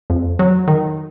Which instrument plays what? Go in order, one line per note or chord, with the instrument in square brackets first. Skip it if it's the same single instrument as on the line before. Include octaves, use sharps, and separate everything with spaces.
[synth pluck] F2
F#3
D#3